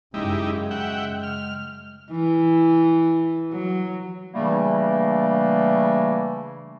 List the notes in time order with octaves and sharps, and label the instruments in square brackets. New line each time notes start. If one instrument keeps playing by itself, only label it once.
[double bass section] F#2 C#3 [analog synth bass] G#3 [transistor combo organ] D#4 E4 G4
[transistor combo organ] E5 F#5 G5
F6
[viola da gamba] E3
F#3
[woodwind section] C#3 E3 G3 A3 A#3 D4